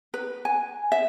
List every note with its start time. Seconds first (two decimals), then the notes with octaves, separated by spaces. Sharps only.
0.14 B4
0.45 G#5
0.92 E5